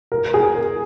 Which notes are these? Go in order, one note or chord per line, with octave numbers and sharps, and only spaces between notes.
A#4
G#4
A#4